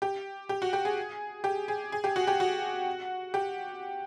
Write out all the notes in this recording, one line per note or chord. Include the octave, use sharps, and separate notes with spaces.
G4
G4
F#4
G4
G#4
G4
G#4
G#4
G4
F#4
G4
F#4
G4